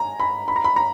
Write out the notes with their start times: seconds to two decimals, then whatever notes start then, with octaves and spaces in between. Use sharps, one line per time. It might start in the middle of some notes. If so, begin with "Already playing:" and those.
Already playing: G#5 A#5
0.20 B5
0.48 B5
0.56 A#5
0.64 B5
0.76 A#5